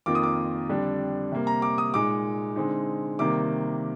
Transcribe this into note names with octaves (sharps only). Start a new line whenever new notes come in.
F2 D#3 A#3 F4 D6
D#6
D6
F2 D3 G3 D4
C3 G3 A#3
A#5
D6
D#6
A#2 G#3 D#4 D6
D3 G#3 C4 D#4
C3 D#3 G3 A#3 D6